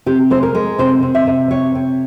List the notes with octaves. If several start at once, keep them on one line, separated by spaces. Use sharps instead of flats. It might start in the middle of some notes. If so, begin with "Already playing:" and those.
C3 G4
G#3 C5
A#4
G#3
C3 C5
C3
E5
C3
C3 C#5
C3